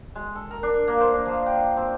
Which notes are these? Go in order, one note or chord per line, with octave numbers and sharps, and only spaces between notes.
G#3
A4
A#4
D4
A#3
C5
D4
F3
G5
C4